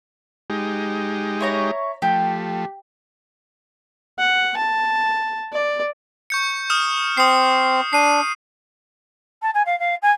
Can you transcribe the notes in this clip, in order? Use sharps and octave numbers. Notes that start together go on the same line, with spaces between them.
G#3 D#4 G4
E4 C#5 A#5
F3 A3 G4
F#5
A5
D5
C#6 G6 C#7
D#6 F6 E7
C4 D#6 C7
D4 C7 D#7
A5
G#5
F5
F5
G#5